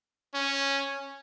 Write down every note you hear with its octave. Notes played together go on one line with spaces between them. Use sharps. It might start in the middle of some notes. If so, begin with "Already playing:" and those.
C#4